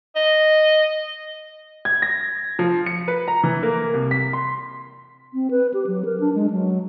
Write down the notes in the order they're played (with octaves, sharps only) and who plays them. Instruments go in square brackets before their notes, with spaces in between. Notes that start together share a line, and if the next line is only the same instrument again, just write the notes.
[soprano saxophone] D#5
[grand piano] G#6
A#6
F3
C#7
B4
A#5
E3
A#3
C2
B6
C6
[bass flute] C4
B4
G4
F#3
A#4
D4
G#3
F#3